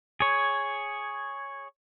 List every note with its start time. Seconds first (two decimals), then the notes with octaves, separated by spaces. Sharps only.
0.20 G#4 C#5